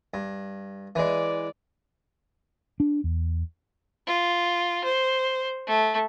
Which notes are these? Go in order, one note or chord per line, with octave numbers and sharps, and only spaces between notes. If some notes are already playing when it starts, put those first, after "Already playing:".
G2
E3 G#3 D5
D4
E2
F4
C5
A3